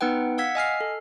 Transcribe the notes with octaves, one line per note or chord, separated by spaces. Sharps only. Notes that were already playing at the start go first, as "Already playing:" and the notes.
B3 D#4 B4 F#5 G5
F5 F#5 E6 G#6 B6
D#5 G#5 F6 C7
A4